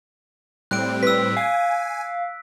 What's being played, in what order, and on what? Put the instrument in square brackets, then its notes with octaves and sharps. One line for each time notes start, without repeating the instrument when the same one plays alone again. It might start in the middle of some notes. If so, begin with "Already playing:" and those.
[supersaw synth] A2 G3 C4 [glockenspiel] F#6 D7
[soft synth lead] B4 [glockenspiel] E6 B6
[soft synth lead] F5 [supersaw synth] G#5